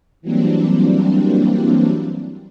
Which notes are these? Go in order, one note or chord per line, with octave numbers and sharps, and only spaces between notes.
E3 F#3 G3 A#3 C4 D4